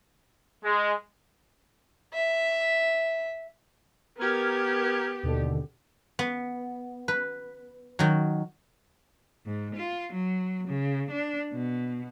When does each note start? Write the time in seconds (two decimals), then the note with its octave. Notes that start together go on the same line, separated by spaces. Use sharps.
0.64 G#3
2.14 E5
4.18 B3 G4 A#4 F6 G#6
5.23 D#2 B2 D3
6.19 B3
7.08 B4
7.99 D#3 F#3
9.46 G#2
9.76 F4
10.13 F#3
10.68 C#3
11.11 D4
11.53 B2